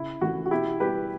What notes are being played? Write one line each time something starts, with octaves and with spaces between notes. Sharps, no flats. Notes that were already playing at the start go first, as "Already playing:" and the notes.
Already playing: C#3 E4
E3 A3 C#4 F#4
F#4
B2 E4 G4
G3 B3 G4 B4